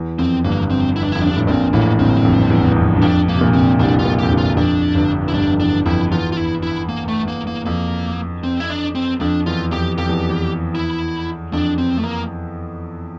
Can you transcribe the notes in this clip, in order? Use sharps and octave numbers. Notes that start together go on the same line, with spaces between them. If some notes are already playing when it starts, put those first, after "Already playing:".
Already playing: E2
F2 C4
G1 G2 A#3
C4
E4
D4
F2 E4
G2 D4
A2
A#1 A#2 C4
A1 A2 A#3
G1 G2 C4
F2
E2
E2
F2
G2
F2 D4
A#3
C3
A#1 A#2
C4
C2 C3 D4
F4
A#1 A#2
F2 G4
G1 G2
F4
F2 D4
G1 G2
E4
G1 G2 D4
F2
E2 D4
F2 E4
E2 F4
F4
E4
E4
A#3
A3
A#3
A#3
F2 A#3
C4
E4
D4
C4
F2 D4
E2 F4
F2 G4
F2 G4
E2
E2
E4
F2 D4
C4
A3
A#3